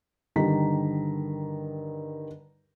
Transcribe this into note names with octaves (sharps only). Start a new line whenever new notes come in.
G2 D3 D#3 G4 A#5 B6